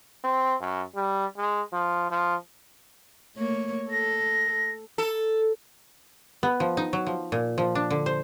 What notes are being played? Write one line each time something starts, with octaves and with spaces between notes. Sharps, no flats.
C4
F#2
G3
G#3
F3
F3
A3 A#3 C#5
A4 A#6
A4
B3
F3
D#4
F#3
F3
A#2
F3
D4
D3
C5